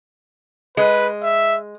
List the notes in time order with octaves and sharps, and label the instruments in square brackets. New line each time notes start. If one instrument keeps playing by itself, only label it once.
[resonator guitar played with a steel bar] G#3 [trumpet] B4
[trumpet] E5